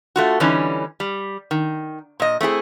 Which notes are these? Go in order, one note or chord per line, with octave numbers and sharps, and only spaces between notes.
A3 F4 F#4
D3 E3 G3 C#4 D#4
G3
D#3
A#2 D#5
A3 C4 E4 G#4